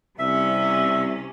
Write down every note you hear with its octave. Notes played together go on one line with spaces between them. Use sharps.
C2 C3 C#4 E5